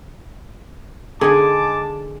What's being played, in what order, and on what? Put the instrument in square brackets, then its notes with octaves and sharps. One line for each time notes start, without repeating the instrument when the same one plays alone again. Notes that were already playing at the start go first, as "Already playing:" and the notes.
[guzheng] D3 D#4 [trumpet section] G#3 A5 D6 [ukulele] G#4